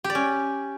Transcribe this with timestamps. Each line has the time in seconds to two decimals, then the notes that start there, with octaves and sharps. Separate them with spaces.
0.04 G4
0.10 D5
0.15 C#4